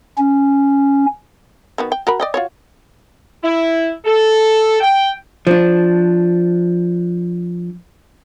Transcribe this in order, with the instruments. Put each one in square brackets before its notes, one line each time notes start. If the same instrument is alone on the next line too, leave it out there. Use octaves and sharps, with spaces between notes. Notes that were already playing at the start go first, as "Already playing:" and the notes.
[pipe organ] C#4
[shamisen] D#3 B3 F#4
G5
F#4 A#4 B5
D5 D#5 G5
F4 F#4 C#5
[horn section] E4
A4
G5
[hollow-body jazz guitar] F3 D4